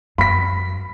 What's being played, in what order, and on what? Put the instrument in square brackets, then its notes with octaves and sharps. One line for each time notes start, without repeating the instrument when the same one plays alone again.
[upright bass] F#2 [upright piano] B5 B6